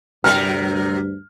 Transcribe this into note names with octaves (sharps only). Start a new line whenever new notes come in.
D2 G2 C3 F#3 A#4 F6